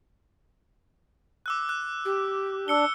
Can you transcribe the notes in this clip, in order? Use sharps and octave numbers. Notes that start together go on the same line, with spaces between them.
D6 E6 F#6
F#6
G4
D4 E6 C#7 G7